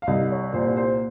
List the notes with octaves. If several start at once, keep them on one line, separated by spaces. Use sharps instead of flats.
F5
C2 D#5
C#5
A#2 C5
C5